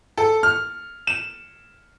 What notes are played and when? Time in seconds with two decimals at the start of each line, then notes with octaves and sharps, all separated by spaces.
0.17 A4
0.43 F6
1.07 E7